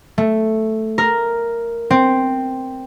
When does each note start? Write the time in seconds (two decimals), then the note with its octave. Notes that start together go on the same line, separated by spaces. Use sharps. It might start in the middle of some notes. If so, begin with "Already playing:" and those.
0.18 A3
0.98 A#4
1.90 C4